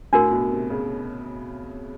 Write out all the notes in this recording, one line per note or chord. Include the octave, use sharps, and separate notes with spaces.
A2 D4 F#4 A#4
B2
C3
C#3